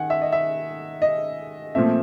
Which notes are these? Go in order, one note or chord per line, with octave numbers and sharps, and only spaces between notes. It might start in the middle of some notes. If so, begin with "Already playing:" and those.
Already playing: D#3 F#5 G#5
E5
D#5
E5
D#5
A#2 F3 A3 C4 E5